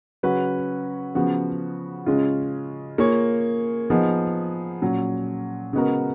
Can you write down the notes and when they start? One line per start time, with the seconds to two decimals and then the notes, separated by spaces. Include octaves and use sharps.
0.23 C#3 F#3 C#4 F#4 B4
1.15 C#3 F3 B3 F#4
2.06 C#3 G#3 C#4 F4
2.98 A#3 F4 G#4 C#5
3.90 F3 B3 D#4 G#4
4.82 A#2 F#3 C#4
5.73 C#3 G#3 B3 F#4 A#4